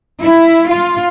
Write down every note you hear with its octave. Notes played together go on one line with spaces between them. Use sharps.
E4
F4